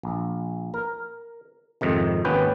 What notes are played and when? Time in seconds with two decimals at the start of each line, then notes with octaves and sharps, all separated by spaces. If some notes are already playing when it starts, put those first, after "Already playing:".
0.03 A#1
0.74 A#4
1.81 F2 G#2 C3 D#3
2.25 G#1 D#2 B3 C#4 B4 G5